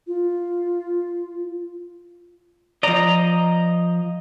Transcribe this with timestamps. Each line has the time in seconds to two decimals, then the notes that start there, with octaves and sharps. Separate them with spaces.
0.07 F4
2.83 F3 D5 D#5 A#5